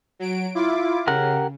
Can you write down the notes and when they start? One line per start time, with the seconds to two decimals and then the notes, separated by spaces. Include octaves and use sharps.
0.19 F#3 D7
0.55 E4 F4 D6
1.07 C#3 G4 A#4 F#5